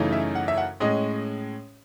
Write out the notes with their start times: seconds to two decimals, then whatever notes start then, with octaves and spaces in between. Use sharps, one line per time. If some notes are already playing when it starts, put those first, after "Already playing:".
Already playing: F#2 C#3 E3 A3 D#4
0.12 E5
0.35 F#5
0.48 E5
0.58 F#5
0.80 A2 G#3 C#4 D#5